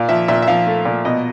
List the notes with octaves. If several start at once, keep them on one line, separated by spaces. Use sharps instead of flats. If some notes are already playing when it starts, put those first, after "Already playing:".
Already playing: A#2 F5
F3 E5
A#2 E5
E5
F3 F5
A3
A#2
B2 D#5